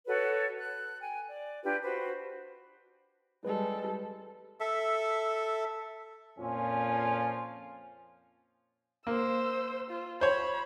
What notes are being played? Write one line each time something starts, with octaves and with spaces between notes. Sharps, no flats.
F#4 A4 B4 C#5
F#6
G5 G#5
D5
D4 F4 G4 B4
F#4 B4 C5
G3 G#3 A4 B4
A4 E5
F2 A#2 F3 C#4 F4 G#5
A#3 C5 E6
F4
C5 C#5 B5